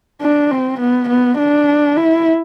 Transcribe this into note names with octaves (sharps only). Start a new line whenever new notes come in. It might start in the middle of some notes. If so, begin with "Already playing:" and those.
D4
C4
B3
B3
D4
E4